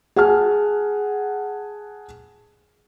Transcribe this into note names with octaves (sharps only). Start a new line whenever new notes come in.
G#4 F#5 G#5 A5 F6